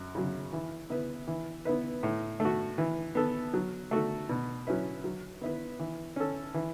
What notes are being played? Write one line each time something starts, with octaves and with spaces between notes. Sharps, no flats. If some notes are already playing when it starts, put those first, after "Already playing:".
Already playing: F#2
C#3 F#3
E3
B3 E4 B4
E3
B3 E4 B4
A2
A3
F#4
E3
B3 A4
F#3
A3 F#4 A4
B2
F#3 C#4 E4 B4
F#3
B3 E4 B4
E3
C#4 A4
E3